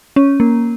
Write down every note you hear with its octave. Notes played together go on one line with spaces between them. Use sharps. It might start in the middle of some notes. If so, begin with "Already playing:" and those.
C#4
A#3